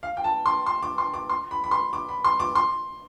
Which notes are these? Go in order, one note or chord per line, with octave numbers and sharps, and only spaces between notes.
F5
G5
A5
C6
C6
D6
C6
D6
C6
B5
B5
C6
D6
B5
C6
D6
C6